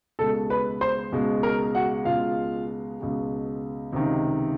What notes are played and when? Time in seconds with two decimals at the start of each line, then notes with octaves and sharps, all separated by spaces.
0.19 C#2 B2 G#3 A4 A5
0.50 B4 B5
0.81 C5 C6
1.12 C#2 B2 G#3
1.43 A#4 A#5
1.75 F#4 F#5
2.05 C#2 B2 G#3 F4 F5
2.99 C#2 B2 G#3
3.93 C#2 C3 D#3